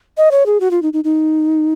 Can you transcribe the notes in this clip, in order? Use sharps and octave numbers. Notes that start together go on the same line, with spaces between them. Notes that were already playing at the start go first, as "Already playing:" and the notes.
D#5
C#5
G#4
F#4
F4
D#4
D#4
D#4